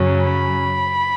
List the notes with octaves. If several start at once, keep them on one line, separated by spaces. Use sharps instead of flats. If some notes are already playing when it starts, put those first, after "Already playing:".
Already playing: F#2 C#3 F#3 C#4
B5